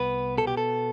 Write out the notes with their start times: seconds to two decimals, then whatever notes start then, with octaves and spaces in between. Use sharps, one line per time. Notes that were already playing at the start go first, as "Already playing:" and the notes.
Already playing: C2 B3 B4
0.38 B2 A4
0.47 G4
0.57 A4